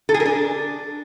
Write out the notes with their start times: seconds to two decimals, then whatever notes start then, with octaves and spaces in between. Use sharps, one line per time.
0.09 A4
0.14 G#4
0.20 A#4
0.26 D4